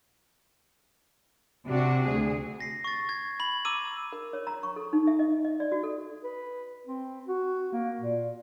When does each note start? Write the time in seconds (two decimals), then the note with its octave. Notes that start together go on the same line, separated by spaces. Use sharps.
1.66 C3 D4 F#4
2.06 D2 G#4
2.60 A#6 C7
2.84 C#6 A6
3.09 G#6
3.40 B5 F#7
3.65 A#5 D6 E6 D#7
4.13 A#4
4.33 C#5
4.47 A#5
4.63 C#6
4.76 A4
4.93 D#4
5.07 E5
5.19 D#5
5.44 D#5
5.60 D5
5.72 F#4
5.83 A4
6.24 B4
6.87 C4
7.27 F#4
7.72 A#3
8.01 A#2